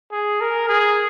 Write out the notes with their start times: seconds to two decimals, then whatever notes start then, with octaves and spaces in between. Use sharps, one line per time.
0.12 G#4
0.41 A#4
0.69 G#4